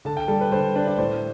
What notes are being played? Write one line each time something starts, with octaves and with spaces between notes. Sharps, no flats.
D3 A5
G5
G3 A4
B4
D3 C5
D4 B4
D5
A2 C5